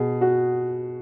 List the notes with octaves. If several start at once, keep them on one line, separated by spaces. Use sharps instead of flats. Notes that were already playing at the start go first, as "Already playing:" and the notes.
Already playing: B2 G#4
F#4